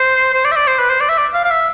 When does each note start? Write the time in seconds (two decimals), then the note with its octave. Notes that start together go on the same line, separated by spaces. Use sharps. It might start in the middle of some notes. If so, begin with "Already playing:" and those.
Already playing: C5
0.34 C5
0.45 D5
0.51 E5
0.56 D5
0.68 C5
0.79 B4
0.90 C5
1.01 D5
1.09 E5
1.18 D5
1.34 F5
1.45 F5
1.51 E5